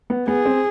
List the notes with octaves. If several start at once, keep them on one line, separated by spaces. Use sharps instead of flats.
B3
B3 G#4
C4